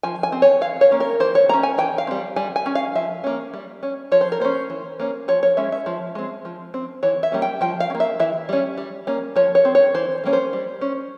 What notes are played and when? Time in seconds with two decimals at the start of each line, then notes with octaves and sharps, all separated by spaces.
0.03 F3 G#5
0.23 G#5
0.32 C4
0.42 C#5
0.61 E3 F5
0.81 C#5
0.91 A#3 C#4
1.00 A#4
1.20 E3 C5
1.35 C#5
1.49 A#3 C#4 A#5
1.63 G#5
1.78 E3 G5
1.98 F5
2.07 G3 C4
2.36 G3 G#5
2.56 G#5
2.66 C#4
2.75 F5
2.95 F3 E5
3.24 A#3 C#4
3.54 G3
3.83 C#4
4.12 F3 C#5
4.21 C5
4.32 A#4
4.40 A#3 C#4 C5
4.70 E3
5.00 A#3 C#4
5.28 F3 C#5
5.43 C#5
5.57 G#3 C#4 E5
5.72 E5
5.86 F3
6.15 G#3 C4
6.45 F3
6.74 C4
7.03 E3 C#5
7.23 E5
7.32 G3 A#3 C#4
7.42 G5
7.61 F3 G5
7.80 F5
7.90 C#4
7.95 A#3
8.00 E5
8.20 E3 E5
8.49 G3 C#4
8.77 G3
9.07 A#3 C#4
9.36 F3 C#5
9.55 C#5
9.65 C4
9.75 C#5
9.94 E3 C5
10.24 G3 A#3 C#4
10.33 C5
10.53 G3
10.81 C#4